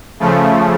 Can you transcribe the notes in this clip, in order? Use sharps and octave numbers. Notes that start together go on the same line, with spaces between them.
C#3 F3 A3